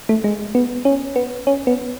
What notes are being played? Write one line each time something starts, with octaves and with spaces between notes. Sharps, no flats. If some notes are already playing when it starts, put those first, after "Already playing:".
A3
G#3
B3
C#4
B3
C#4
B3